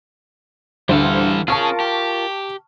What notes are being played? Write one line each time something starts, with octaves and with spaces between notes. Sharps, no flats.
D2 E3 G3 A4 C5 F5
C#4 F4 G#4 A#4 A5 C#6 F6
G4